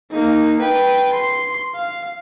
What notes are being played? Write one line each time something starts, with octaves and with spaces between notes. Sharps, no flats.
A#3 D#4
B4 G5
C6
F5